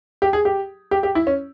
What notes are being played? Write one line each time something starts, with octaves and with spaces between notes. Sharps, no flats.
G4
G#4
G4
G4
G4
E4
C#4